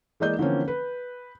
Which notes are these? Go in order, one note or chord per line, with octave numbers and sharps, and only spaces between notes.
E3 G#3 A#3 D5 D#5 G6
D3 E3 F3 A#3 C4 C#4
B4